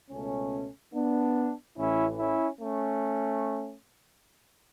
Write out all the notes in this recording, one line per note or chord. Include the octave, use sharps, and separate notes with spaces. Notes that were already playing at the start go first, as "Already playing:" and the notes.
C#2 B2 A3 C#4
B3 D4
A1 A2 E3 C#4 E4
C#4 E4
A3 C#4